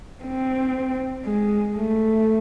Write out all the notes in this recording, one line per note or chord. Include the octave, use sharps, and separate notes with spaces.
C4
G#3
A3